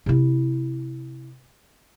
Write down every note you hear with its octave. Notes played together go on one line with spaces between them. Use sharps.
C3 E4